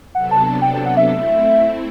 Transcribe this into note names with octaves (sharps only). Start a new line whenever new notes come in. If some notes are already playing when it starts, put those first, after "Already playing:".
C3 F#3 B3 D4 A4 F#5
A5
A5
G5
G5
F#5
E5
A3 C4 E4